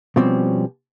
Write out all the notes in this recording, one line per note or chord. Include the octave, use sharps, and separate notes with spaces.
B2 F3 G3 C4 C#4